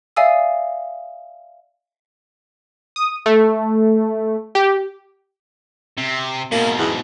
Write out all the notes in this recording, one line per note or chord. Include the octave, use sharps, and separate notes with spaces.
D5 E5 F5 G#5 D#6 E6
D#6
A3
G4
C3
G#2 B2 A#3
E2